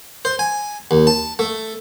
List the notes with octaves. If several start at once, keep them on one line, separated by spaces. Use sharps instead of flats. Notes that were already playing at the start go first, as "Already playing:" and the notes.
C5
G#5
D#2
A5
A3